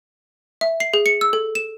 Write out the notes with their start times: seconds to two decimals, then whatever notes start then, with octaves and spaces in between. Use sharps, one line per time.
0.61 E5
0.80 C7
0.94 G#4
1.06 C#7
1.21 E6
1.33 A4
1.55 E7